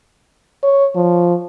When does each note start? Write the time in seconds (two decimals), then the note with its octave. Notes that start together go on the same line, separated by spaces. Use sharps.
0.63 C#5
0.95 F3